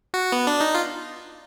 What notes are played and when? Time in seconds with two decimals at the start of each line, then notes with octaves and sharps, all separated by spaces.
0.14 F#4
0.32 B3
0.47 D4
0.60 D#4
0.75 F4